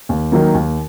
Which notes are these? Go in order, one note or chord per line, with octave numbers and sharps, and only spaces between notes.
D#2
D#3 F#3 A#3
D#2